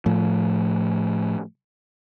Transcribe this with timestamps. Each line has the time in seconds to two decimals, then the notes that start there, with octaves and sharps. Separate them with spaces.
0.06 A2 F3